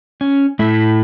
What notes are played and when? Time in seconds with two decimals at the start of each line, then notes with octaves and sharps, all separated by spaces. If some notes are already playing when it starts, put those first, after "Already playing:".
0.21 C#4
0.59 A2 A3 E4